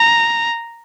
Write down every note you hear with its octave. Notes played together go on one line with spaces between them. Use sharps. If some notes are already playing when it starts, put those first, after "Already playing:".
Already playing: A#5